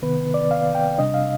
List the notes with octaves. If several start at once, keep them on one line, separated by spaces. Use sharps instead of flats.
C3 D#3 B3 B4
D5
F5
G5
C3 G3 D4 D#5
F5